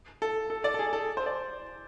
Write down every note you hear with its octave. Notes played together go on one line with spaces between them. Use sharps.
A4
A4
D5
A4
G#4
A4
C5
D5